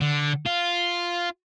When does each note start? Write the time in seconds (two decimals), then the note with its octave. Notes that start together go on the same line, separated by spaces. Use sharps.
0.01 D3
0.46 F4